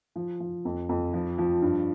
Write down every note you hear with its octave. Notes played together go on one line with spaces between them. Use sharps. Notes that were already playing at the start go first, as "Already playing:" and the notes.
F3
F3
F2
F2
F3
F3
G2